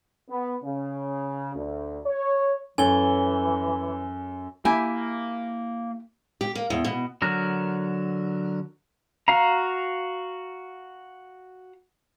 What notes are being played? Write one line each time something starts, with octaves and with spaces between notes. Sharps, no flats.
B3
C#3
D2
C#5
F#2 E3 A4 C#5 G#5 G7
A#3 E4 G4 G#5
G4
A#3
E2
B2
D3 F#3 A#4
F#4 F5 A#5